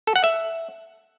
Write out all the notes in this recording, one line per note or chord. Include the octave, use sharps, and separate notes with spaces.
A4
F#5
E5